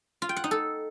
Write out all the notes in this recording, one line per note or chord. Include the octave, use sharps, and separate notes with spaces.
F4
G5
F#5
D#4
A4